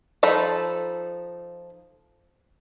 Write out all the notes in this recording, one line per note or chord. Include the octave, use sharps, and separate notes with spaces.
F3 D#4 A4 B5